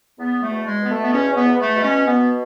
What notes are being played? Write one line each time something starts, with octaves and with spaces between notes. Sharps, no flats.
E2 B3
A3
B2
G#3
B2 B3
A3
B3
E2 C#4
C#4
B3
E2
B3
A3
B2
C#4
B2 B3